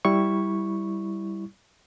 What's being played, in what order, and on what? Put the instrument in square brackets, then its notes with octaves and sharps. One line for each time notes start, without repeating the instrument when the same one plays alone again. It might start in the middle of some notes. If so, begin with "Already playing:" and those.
[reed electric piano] G3 E4 C#6